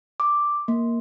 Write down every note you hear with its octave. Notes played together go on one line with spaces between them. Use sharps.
D6
A#3